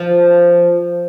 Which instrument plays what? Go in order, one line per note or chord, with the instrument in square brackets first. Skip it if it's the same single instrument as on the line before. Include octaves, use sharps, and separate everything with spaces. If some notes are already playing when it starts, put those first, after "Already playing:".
Already playing: [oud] F3